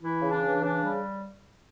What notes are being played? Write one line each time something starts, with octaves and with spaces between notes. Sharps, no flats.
E3 E4
C#3
D4
E3
C#3 D4
G3